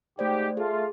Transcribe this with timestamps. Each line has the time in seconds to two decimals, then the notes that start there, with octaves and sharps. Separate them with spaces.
0.19 G#2 A3 G4 C5 D5
0.57 A3 F4 G#4